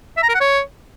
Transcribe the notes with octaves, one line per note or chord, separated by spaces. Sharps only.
E5
A#5
A#4
F#5
C#5